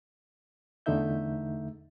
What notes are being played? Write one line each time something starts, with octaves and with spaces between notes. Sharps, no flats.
E2 D3 A3 D#4 E5 G6